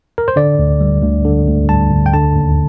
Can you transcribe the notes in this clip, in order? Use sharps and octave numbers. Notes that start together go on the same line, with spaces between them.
A#4
C5
D3 D5
D2
G3
D2
D3
D2
G3 A5
D2
G5
D3 A5
D#2